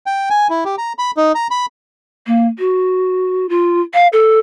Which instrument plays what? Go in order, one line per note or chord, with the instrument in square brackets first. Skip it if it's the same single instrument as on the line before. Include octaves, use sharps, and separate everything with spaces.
[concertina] G5
G#5
E4
G4
A#5
B5
D#4
A#5
B5
[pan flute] A#3
F#4
F4
F5
A4